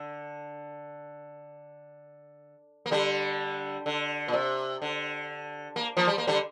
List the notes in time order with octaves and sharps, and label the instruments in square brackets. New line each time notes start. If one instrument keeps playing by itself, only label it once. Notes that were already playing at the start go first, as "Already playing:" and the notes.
Already playing: [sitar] D3
A#3
D3 G3
D3
A#2
C3
D3
A#3
F3 A#3
G3
A#3
D3 G3